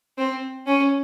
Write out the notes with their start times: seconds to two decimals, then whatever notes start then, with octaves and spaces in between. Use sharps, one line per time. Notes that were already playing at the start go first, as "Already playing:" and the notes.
0.18 C4
0.67 C#4